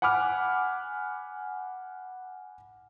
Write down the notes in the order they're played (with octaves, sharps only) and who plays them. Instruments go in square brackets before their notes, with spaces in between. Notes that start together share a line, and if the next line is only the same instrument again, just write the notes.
[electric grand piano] F#5 G#5 B5 D6 F6